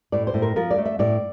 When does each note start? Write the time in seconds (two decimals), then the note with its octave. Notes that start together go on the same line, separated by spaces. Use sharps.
0.12 A2 D5
0.27 C5
0.34 A2
0.42 A#4
0.56 F3 A#4
0.71 D5
0.78 A3
0.85 E5
0.99 A2 D5